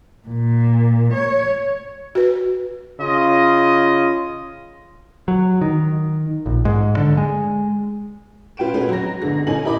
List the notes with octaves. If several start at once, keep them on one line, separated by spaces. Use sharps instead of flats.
A#2
C#5
F#4 B4
C#3 F4 D#5
F#3
D#3
A#1
G#2
D3
G#3
C#4 F4 B4 G5 D7 E7
G#3 A3 C#4 D#4 F#4 B4
F#3 A#5 A#6
G1 D3 G#3 A#6
A1 A3 C#4 D#4 G#5 F#7
E4 G4 A#4 D#5 B5 D6